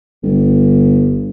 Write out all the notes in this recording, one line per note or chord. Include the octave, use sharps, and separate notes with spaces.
G1